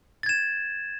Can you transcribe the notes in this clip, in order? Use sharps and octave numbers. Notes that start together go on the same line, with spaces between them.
G#6 A6 E7